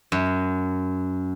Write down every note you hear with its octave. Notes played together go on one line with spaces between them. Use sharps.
F#2